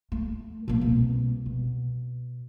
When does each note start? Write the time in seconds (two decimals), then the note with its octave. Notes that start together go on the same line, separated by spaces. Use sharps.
0.12 A3
0.68 A#2 A#3
0.81 C2 B2
1.46 B2